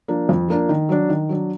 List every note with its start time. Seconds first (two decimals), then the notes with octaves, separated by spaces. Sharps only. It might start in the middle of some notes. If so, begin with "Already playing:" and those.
0.08 F3 A#3 D4
0.29 F2
0.48 F3 A#3 D4
0.69 D#3
0.89 F#3 D4
1.09 D#3
1.29 F#3 D4